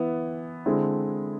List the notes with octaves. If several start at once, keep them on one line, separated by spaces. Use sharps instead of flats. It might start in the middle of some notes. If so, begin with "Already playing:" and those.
Already playing: E3 B3 E4
D3 G#3 C4 E4